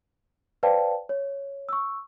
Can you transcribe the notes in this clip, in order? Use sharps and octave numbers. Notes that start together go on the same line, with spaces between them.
B4 C5 D5 F5 G5 A5
C#5
C#6 E6